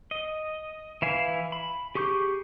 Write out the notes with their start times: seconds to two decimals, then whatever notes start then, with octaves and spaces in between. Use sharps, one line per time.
0.11 D#5
1.02 E3 E4 F5 G#5
1.52 B5
1.95 G4 G#4 C#6 D6 G6